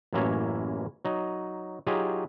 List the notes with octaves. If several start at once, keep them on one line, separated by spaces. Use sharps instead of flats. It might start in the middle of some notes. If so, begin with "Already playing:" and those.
A1 F#2 E3 A#3 E4 C#5
F#3 D#4
F#3 D#4 F4 G4 G#4